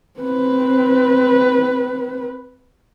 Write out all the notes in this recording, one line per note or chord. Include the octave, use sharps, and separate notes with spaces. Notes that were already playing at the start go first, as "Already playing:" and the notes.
C4 B4